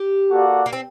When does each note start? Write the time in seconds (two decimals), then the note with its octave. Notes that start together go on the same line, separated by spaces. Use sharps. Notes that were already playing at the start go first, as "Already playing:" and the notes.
Already playing: G4
0.30 A#3 F#4 A4 D5 F#5
0.66 A#3
0.73 C4